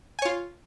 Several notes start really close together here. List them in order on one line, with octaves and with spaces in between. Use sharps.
G#5 C#5 F4